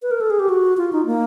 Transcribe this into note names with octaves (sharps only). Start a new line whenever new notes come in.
B4
A#4
A4
G#4
G4
F#4
F4
D#4
A#3